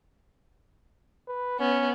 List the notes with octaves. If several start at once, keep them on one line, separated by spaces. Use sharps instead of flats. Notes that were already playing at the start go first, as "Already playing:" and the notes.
B4
B3 C#4